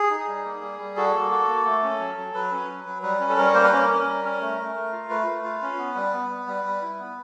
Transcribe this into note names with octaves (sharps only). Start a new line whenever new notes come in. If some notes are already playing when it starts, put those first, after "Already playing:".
Already playing: G#4
D#4
G3
A#3
G3
G3
F#4 A4
A#3
F#4
A#3
A3
C#4
F#3
F#3
F#3 B4
C#4
F#3
F#3
G3 B4
C#4
A4
G3 A#4
C#5
A#3 C5
B4
C#4 A#4
C#4
G3
C#4
A3
A3
A3
F4
A3 B4
A3
F4
C#4
B3
G3
B3
B3
G3
G3
E4
B3